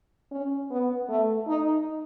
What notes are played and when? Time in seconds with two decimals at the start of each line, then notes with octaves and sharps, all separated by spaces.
0.31 C#4
0.71 B3
1.09 A3
1.48 D#4